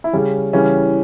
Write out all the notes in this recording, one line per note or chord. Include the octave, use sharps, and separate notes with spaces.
E4
C#3 G3 C#4
C#3 E3 G3 C#4